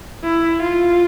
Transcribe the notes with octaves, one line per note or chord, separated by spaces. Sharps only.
E4
F4